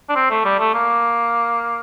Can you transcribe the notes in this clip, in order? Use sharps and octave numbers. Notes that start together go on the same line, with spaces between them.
D4
C4
A3
G3
A3
A#3